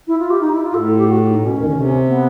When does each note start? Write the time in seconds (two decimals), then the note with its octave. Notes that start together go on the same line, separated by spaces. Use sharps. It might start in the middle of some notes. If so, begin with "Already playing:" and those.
0.07 E4
0.19 F4
0.30 G4
0.40 D#4
0.52 E4
0.64 F4
0.74 A2 A4
0.97 G4
1.08 F#4
1.30 D#4
1.41 B2 C#4
1.57 D#2 D#3
1.66 D2 D3
1.74 C3
2.07 B3